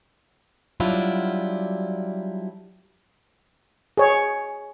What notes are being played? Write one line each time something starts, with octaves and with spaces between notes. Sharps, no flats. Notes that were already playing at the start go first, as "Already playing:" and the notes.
F#3 G3 D4 E4 F4
G#4 C#5